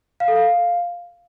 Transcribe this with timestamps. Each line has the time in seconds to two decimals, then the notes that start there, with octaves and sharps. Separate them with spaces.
0.20 F5
0.28 A4
0.36 F5